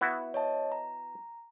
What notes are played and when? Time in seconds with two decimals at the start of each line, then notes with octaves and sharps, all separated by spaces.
0.01 B3 E4 F#4
0.34 C#5 D#5 A5
0.72 A#5